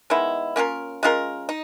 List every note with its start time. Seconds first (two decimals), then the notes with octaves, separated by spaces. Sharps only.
0.10 D#3 G#3 B3 E4
0.56 A#3 C#4 F4 A#4
1.03 G#3 C#4 F4 A#4
1.49 D#4